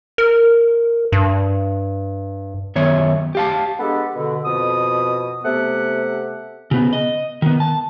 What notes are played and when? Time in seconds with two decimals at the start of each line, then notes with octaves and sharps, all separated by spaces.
0.18 A#4
1.12 G2
2.76 F#2 D#3 B3 C#5 E5
3.35 G4 F5 A5
3.78 G#3 B3 D4 G4 A4
4.14 B2 D3
4.45 F2 B2 D#6
5.44 C3 A3 B3 G4 F#5
6.71 C#3 B3
6.93 D#5
7.42 D#3 B3
7.60 A5